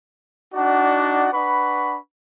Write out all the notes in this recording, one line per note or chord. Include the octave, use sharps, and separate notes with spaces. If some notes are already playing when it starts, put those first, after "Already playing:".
D4 D#4 F#4 D5 F#5
D4 B4 F#5 B5 C#6